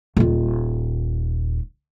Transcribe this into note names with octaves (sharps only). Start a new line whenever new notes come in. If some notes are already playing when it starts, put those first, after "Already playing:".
D#1 F4